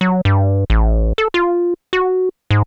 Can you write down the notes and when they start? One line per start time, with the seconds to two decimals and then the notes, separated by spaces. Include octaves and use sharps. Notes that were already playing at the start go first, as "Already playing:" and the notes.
0.01 F#3
0.25 G2
0.70 A1
1.18 A4
1.34 F4
1.93 F#4
2.51 G#2